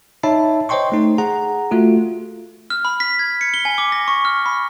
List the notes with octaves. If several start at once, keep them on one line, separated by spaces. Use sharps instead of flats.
D#4 C#5 E5 A5 B5
C5 C#5 D#5 G5 C6 C#6
A3 D#4
G#4 F#5 A#5
A3 F4 F#4
F6
B5
B6
G#6
C#7
G7
G#5
D6
A#6
C#6
F6
B5